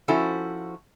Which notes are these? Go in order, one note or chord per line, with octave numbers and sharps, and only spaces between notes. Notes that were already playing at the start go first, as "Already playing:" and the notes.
F3 C#4 E4 F#4 A4 C5